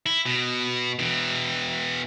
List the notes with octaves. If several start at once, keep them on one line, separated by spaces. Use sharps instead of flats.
E4
B2
B2 E3